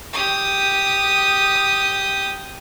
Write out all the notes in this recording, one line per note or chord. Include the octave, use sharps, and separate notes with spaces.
G4 D#6